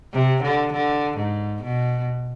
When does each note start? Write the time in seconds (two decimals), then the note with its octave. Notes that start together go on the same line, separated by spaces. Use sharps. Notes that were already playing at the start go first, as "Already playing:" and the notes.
0.13 C3
0.43 D3
0.73 D3
1.17 G#2
1.62 B2